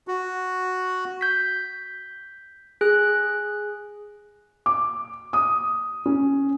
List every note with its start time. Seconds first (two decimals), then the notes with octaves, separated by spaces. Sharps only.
0.08 F#4
1.21 G6 B6
2.81 G#4 F#6
4.66 D6
5.33 D#6
6.06 C#4